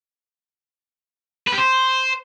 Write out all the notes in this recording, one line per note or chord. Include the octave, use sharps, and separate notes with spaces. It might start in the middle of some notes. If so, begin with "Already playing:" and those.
B4
G4
C5